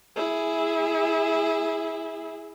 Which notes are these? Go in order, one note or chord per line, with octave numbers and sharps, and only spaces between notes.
E4 G#4